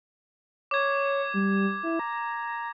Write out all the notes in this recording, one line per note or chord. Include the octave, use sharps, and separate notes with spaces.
C#5 D6 G#6
G3
E4
A#5